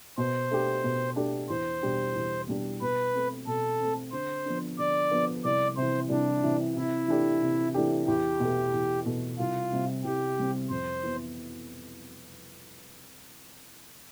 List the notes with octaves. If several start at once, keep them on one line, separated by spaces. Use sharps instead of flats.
B2 C5
A3 D4 G4
B2
A3 D4 G4
E2 C5
B2 G3 D4 G4
E2
B2 G3 D4 G4
B2 B4
A3 C4
B2 A4
A3 C4
D3 C5
F3 B3 D4
D3 D5
F3 B3 D4
C2 D5
C3 E3 C5
C2 D4
C3 E3
C3 E4
E3 A3 D4 G4
C3
E3 A3 D4 G4
E2 G4
B2 A3
E2
B2 A3
C2 F4
C3 G3 C4
C2 G4
C3 G3 C4
F2 C5
E3 B3 E4